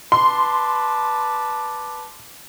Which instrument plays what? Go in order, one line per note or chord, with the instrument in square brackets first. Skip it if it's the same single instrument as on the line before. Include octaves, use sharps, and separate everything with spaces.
[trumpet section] B4 D5 A5 [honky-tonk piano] C6